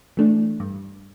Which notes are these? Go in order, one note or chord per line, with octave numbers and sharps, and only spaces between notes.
E3 A3 D4
G2